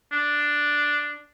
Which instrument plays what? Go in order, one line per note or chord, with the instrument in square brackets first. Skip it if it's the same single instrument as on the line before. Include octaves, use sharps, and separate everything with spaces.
[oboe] D4